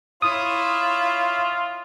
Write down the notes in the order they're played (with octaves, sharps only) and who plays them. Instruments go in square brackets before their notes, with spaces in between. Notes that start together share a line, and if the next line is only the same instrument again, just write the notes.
[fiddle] E4 C#5 [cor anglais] F4 [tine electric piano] D#6